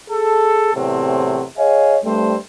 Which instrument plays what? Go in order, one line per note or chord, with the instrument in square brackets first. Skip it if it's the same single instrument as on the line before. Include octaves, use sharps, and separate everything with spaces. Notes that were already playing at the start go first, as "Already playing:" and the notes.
[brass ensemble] G#4 A4
E2 A2 C3 F#3 C4
G#4 C#5 D#5 F5 G#5
G2 G3 A3 C4 C5